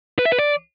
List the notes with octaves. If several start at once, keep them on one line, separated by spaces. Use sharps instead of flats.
B4
E5
B4
D5